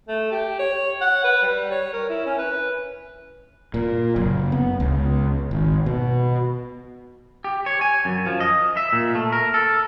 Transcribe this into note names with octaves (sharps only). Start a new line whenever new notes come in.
A3
G4
C#5
F#5
B4
G3
C#5
A#4
E4
C#4
B4
A#2
F#1
B3
C#2
G#1
B2
G4
C#5
G#5
F#2
F3
D#5
E5
A#2
A3
A#4
A4